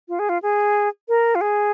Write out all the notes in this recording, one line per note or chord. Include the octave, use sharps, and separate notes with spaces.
F4
G#4
F4
G#4
A#4
F4
G#4